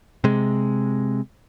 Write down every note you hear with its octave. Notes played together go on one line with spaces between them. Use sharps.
C3 G#3